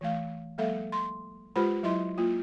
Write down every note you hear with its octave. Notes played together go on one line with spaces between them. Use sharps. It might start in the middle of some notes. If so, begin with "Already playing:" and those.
E3 A3 F5
F#3 G#3 A#3 A4 E5 F5
C6
G#3 F4 G4 B4 C5 B5
F#3 E4 D#5 E5 C6
A#3 F4